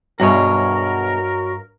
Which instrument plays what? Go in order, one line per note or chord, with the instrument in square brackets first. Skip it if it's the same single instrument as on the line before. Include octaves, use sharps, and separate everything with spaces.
[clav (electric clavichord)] B1 E2 B2 [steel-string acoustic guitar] G2 D#5 [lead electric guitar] F#4 C#5 [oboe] A#4